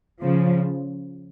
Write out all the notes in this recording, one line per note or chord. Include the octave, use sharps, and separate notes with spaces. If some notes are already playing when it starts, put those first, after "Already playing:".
C#3 F3